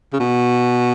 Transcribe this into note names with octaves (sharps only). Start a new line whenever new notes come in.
C#3
B2